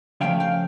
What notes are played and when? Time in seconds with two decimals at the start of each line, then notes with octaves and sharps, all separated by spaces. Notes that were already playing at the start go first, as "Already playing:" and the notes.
0.21 C#3 F3 A3 F5 G5
0.40 F5 G5